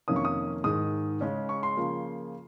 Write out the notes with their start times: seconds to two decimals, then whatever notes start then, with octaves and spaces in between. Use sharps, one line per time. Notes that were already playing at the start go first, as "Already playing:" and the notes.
0.08 F2 C3 D#3 A#3 C#4 D#6
0.16 C#6
0.25 D#6
0.64 G#2 D#3 G#3 D#6
1.21 C#3 G#3 C#4
1.49 C#6
1.63 C6
1.77 C#3 F3 A#3